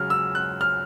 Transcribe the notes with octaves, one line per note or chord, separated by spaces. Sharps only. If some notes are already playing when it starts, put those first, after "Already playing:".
Already playing: C#3 F#3 F6
E6
F#6
F6